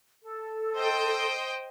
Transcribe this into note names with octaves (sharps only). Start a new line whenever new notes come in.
A4
C5 D#5 G5